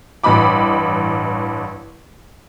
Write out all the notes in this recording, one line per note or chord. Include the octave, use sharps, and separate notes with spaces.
A1 G2 D#5 B5 D6